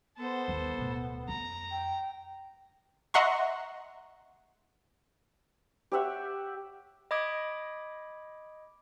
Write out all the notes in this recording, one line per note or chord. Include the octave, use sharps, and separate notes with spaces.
B3 A4 C5
G1 D#2
D1 B2
F2 A#5
G5
D#5 E5 F#5 A#5 C6 C#6
G4 C#5 E5 F#5
D#5 B5 D6 D#6 G#6 D7